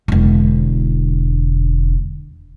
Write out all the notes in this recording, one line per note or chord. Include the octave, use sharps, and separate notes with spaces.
E1 D3